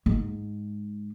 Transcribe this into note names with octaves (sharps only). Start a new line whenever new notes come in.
G#2 G#3